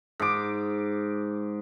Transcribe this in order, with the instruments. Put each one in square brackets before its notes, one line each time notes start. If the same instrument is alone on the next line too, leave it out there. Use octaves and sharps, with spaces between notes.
[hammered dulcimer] G#2 D6